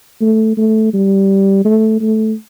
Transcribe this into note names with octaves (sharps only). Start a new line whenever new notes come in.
A3
A3
G3
A3
A3